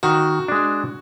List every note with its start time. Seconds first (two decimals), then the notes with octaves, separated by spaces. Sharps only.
0.03 D#3 F#4
0.48 G#3 D4